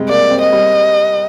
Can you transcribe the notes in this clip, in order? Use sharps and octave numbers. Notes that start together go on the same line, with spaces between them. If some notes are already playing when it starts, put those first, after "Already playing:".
Already playing: C3 G3 G#3
A#3 D5
C4
D#5
G3